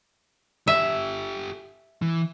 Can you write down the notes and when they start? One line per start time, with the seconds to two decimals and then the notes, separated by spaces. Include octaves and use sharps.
0.67 G4 A4 E5
2.02 E3